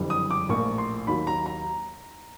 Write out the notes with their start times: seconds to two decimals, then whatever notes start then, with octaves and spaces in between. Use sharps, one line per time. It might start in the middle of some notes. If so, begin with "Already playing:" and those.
Already playing: F#1 F2 D3 G3
0.10 D#6
0.31 D6
0.49 A#1 A2 F3 A#3 C#6
0.78 C6
1.07 D#2 D#3 F#3 B5
1.27 A#5
1.46 A#5